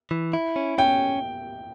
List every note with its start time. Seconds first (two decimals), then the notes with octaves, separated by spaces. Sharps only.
0.11 E3
0.33 E4
0.56 C#4
0.78 C#4 G5